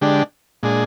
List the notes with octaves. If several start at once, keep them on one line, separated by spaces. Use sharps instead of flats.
D3 G#3 D4 G4
A#2 G#3 D4 G#4